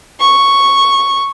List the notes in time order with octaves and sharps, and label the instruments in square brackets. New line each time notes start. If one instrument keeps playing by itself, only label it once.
[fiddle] C#6